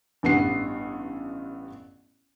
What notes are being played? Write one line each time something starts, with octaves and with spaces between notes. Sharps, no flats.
A1 G2 B3 F#5 C7